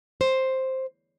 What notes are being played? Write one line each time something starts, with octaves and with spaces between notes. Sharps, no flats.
C5